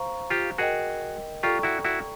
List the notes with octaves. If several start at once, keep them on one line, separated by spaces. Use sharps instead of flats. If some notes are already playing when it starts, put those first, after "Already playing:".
Already playing: C5 F5 A#5 C#6
F4 G4
F#4 G#4 A#4 D#5 G5
F4 G4 A4 D5 G5 A#5 C#6
E4 F#4
E4 F#4